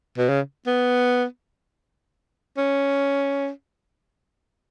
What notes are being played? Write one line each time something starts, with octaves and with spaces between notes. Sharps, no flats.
B2
C#3
B3
C#4